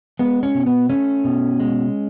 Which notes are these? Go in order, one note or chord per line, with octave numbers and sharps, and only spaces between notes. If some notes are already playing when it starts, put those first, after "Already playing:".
G#3 B3
C#4
B2
B3
A3 C#4
B2
G#3